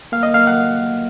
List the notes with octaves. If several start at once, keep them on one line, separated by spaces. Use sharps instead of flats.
A#3 F5
D#5
A#3 F5
F#5